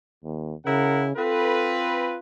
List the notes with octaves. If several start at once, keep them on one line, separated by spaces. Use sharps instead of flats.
D#2
C#3 E4 A#4 F#5
C4 F4 A4 B4